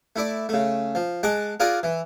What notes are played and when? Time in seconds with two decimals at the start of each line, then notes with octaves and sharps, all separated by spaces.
0.16 A3 E4 D5
0.49 C#3 A3
0.95 F3
1.23 G#3 F#5 A5 D6
1.60 F4 G#4 A#4 D5 F#5
1.83 E3